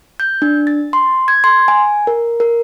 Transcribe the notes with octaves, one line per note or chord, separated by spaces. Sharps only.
G6
D4
A6
C6
G#6
C6
G#5
A#4
A#4